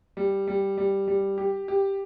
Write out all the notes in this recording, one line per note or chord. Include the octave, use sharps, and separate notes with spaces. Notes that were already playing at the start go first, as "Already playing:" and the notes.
G3
G3
G3
G3
G4
G4